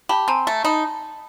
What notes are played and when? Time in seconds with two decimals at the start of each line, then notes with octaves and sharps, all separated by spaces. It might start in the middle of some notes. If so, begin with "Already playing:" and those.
0.09 G4 A5 B5
0.28 C4 G#5 A#5
0.47 A3
0.65 D#4 A5 B5